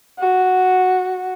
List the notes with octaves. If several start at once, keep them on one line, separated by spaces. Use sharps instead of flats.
F#4